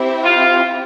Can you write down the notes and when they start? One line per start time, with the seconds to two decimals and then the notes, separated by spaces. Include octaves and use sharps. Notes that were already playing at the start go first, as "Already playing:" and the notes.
Already playing: C4 E4 G4 C5 E5
0.24 F4